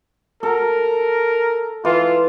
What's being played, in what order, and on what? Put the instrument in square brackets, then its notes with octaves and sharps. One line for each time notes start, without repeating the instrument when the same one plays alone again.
[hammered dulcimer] A4 [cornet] A#4
[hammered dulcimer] E3 [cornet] F4